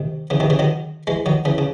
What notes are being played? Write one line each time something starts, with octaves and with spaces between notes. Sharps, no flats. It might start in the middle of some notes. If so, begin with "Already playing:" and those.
Already playing: C3 D#3
C#3 E3
C3 D#3
C#3 E3
D#3 F#3
E3 G#3
D#3 F#3
C#3 E3
C#3